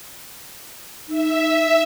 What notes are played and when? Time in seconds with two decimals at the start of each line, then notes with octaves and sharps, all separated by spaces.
1.08 D#4 E5